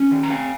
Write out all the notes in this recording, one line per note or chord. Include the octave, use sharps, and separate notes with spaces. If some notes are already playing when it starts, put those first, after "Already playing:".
Already playing: C#4
D#3
A#5
C4 F5 G#5